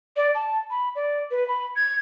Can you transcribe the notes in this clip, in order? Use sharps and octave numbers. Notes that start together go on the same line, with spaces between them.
D5
A5
B5
D5
B4
B5
G#6